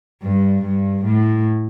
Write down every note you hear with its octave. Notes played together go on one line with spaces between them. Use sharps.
G2
G2
A2